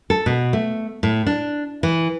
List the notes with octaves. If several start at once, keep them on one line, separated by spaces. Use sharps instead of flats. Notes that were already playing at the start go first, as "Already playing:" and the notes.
A4
B2
A3
A2
D4
E3